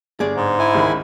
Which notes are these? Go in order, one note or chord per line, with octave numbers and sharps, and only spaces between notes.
G1 G#4 D5
G#2
E4 G#5
C#2 D#3 B5